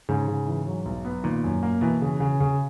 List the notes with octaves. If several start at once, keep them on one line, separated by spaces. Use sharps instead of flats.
G#2 C#3
C#3
E3
F#3
B1
B3
A#2 D#3
F#2
A#3
B2 E3
C#3
C#3
C#3